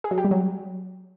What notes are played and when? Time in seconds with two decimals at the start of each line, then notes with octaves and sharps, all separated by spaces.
0.04 G#4
0.11 F#3
0.18 G4
0.24 G3
0.31 F#3